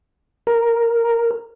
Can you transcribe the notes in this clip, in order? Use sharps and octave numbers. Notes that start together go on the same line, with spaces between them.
A#4